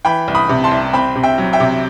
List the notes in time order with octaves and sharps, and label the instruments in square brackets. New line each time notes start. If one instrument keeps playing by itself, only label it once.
[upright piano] E3 G5 B5
C2
B5 D#6
C3
A5 C6
C2
C4 G5 B5
C3
E5 G5
F#3
E5 G5
C3